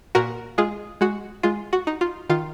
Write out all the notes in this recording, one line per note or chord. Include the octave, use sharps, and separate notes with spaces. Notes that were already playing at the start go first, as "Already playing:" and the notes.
A#2 F#4 A#4
G#3 F4 G#4
G#3 F#4
G#3 F4
F#4
D#4
F4
D#3 F4